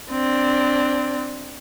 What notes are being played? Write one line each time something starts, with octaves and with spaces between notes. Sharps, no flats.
C4 D4